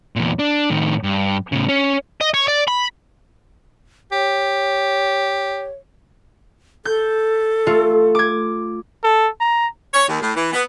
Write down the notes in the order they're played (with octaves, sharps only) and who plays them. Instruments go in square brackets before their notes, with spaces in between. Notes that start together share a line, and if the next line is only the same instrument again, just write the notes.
[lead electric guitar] E2 A#2
D4
A2 D#3
G2
A2 C#3
C#4
[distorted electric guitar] D#5
C#5
D5
B5
[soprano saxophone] G4 [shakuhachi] C#5
[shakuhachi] A4 [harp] G6
[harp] A3 F4
D6 G#6
[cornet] A4
A#5
[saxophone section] C#5
D#2
A2
E3
B3